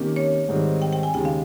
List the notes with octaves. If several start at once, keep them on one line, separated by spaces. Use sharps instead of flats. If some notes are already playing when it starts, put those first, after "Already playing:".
Already playing: C3 D#3 A#3 C#4 G4
C#5
G#2 D#3 G3 C4
G5
G5
G#5
D#2 C#3 G#3 G5
F5